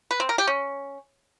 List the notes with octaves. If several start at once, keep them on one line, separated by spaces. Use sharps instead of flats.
B4
C4
A#4
G4
C#4